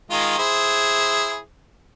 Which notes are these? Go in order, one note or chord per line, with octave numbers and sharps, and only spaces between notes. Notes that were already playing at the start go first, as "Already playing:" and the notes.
D#3 G#3 F4
E4 G#4 C5